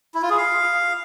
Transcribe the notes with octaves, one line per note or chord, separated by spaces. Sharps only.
E4
F4
G#4
F5